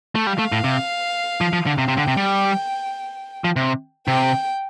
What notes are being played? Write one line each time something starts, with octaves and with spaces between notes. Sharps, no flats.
A3
G3 F5
A3
A2
C3
F3
F3
D3
C3 G5
C3
D3
C3
G3
F3
C3
C3 G5